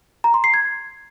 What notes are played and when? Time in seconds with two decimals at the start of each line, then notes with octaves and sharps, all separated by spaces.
0.24 A#5
0.34 C6
0.44 C7
0.54 G#6